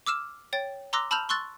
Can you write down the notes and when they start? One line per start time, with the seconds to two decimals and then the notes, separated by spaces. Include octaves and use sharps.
0.06 D6 E6 F6 E7
0.53 C#5 G5 A6
0.93 A#5 C6 D6 E6 F#6 A#6
1.11 A5 B5 E6 F6 G6 F7
1.29 C6 C#6 E6 F#6 A6